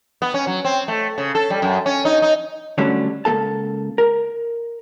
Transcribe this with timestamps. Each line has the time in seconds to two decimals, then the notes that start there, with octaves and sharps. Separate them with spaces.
0.22 B3
0.34 C#4
0.47 F#3
0.65 C4
0.88 A3
1.18 C#3
1.35 A4
1.50 G3
1.62 F#2
1.86 C#4
2.05 D#4
2.22 D#4
2.78 D3 F#3 G3 A3 C#4 D4
3.25 C#2 C#3 A#3 A4 A5
3.98 A#4